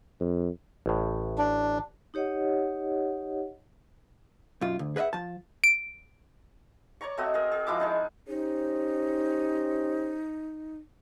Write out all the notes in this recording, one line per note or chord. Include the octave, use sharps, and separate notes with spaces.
F2
A1 A2
D4
D#4 G4 C#5 D#5 F#5
B1 F#2 F4
D2
G#4 B4 D#5 E5 F#5
F3 A5
D7
C#5 D5 A#5 C#6
A3 C4 F#4 D#5
G#4 A#4
G#4
F3 G#3 E4 D6
D4 D#4 G#4
C#4 D#4 G4 C5